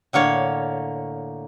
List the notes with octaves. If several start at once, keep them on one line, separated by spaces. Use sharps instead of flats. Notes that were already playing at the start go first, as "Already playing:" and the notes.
A2 D3 A#3 C#5